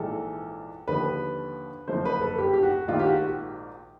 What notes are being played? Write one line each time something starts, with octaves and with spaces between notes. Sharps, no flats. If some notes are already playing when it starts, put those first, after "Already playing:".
Already playing: A#1 G#2 E3 A4
D#2 D3 F3 B4
F#1 F#2 D3 F3 C5
B4
A4
G4
G4
F#4
A#1 G#2 D#3 F4
G4
F#4